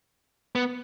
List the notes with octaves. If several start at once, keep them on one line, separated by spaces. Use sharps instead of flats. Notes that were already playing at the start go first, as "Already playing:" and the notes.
B3